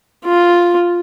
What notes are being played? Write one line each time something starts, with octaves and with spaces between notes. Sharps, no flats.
F4